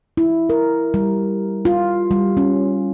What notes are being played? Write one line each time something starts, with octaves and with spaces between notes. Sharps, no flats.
E4
A#4
G3
F4
G3
C#4